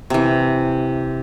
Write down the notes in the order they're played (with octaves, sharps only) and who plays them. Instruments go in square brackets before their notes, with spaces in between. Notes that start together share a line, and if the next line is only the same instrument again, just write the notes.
[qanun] C3 E3